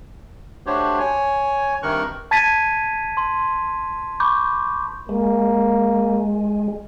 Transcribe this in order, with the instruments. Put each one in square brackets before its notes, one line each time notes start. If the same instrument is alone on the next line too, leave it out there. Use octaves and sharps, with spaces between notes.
[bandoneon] A3 D4 F#4 G4 C5 C#5
C#5 G#5
G2 C3 D#3 A#4 C#6 F#6
[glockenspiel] A5 G#6 A6 B6 D#7
C6
B5 C#6 D6 G6
[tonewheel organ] G#3 [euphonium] A#3